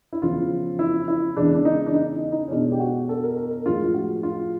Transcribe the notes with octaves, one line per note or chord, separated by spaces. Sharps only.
E4
E2 C#3 F3 F4
E4
E4
E2 C#3 E3 G#3 D4
D4
D#4
D4
D#4
D#4
C#4
B2 G#3 D4
G4
F#4
A4
A#4
A#4
A#4
A2 F3 G#3 F4
F4
F#4
F4